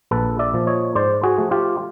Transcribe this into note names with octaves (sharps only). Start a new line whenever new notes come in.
A#1 A4 B4
D5 E5
A#2 F3
C#5 D#5
G#2 C5 D5
F#4 G#4
F3 A3
F4 G4